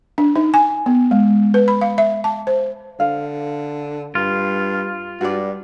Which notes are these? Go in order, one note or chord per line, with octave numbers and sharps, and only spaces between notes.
D4
D#4
G#5
B3
G#3
B4
B5
F5
E5
A5
C5
D3 F5
G2 F4
G2 F#4 D5